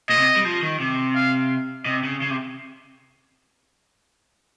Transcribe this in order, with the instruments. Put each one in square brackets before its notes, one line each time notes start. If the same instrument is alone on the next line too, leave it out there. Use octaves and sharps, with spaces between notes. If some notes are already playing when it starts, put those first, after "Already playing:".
[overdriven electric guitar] A#2 [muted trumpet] D#5
[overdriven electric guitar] C3
G3
F3
D#3
C3
[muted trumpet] F5
[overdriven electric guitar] C3 [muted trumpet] D#5
[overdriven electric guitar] C#3
C#3
C3